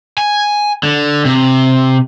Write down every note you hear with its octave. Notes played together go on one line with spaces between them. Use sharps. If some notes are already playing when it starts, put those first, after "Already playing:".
G#5
D3
C3